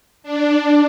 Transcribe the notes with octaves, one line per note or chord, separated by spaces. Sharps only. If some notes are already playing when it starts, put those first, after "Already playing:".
D4